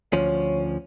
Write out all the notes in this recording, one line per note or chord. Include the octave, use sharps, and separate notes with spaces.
D2 F3 C#4 C#5